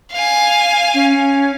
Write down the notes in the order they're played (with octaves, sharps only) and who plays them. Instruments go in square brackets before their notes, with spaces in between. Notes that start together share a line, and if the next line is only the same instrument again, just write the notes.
[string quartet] F5 G#5
[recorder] C#4